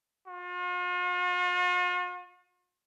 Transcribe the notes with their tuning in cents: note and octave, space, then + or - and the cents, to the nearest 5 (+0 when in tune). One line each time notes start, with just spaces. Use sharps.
F4 +45